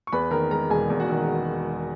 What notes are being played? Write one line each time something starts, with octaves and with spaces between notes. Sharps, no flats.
C#6
E2 B4 B5
D#3 A#4 A#5
G#3 A#4 A#5
E1 G#4 G#5
E2
F#4 F#5
D#3